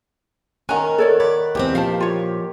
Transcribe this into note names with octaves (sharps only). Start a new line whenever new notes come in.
D#3 C#4 F#5 G#5 A#5
A4 C#5 D5
C#5 D5 B5
E2 G#2 C4 G4
A#2 F3 F5 A5
F4 C#5